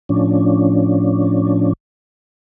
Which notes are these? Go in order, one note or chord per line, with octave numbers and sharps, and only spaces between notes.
A2 F3 C#4 D4